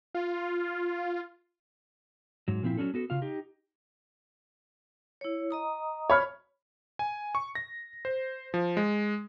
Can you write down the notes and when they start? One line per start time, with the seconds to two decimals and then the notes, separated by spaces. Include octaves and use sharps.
0.15 F4
2.48 G#2 F#3
2.63 A#2 F3 C4 E4
2.77 F#3 C#4 D4 A4
2.94 B3 F#4 A4
3.10 C#3 F4 F5
3.22 D#4 G4
5.21 E4 C#5
5.51 D#5 A#5 D#6
6.10 C#5 B5 F6
6.99 G#5
7.35 C#6
7.55 A#6
8.05 C5
8.54 F3
8.77 G#3